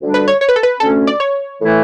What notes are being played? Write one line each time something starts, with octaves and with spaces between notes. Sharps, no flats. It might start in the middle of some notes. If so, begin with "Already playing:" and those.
D2 D3 G3 D4
B4
C#5
C#5
B4
A4
B4
D2 D3 A3 C#4 A4
D5
C#5
A2 E3 A3 E4